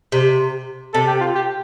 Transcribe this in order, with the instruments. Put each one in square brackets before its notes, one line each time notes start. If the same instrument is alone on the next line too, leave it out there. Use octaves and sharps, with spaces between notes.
[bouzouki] C3
[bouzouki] C3 [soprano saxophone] A4
[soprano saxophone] G4
F4
G4